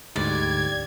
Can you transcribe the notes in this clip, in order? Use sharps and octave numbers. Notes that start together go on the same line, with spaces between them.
D2 G#2 G4 D5 G#6